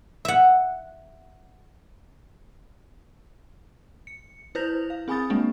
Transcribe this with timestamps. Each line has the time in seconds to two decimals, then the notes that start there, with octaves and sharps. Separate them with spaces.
0.25 E5 F#5
4.07 C#7
4.55 E4 B4 C5 G6 A#6 F7
4.90 F5
5.08 C4 G#4 G#5 B5 D#6 A6
5.30 G#3 A#3 C4 D4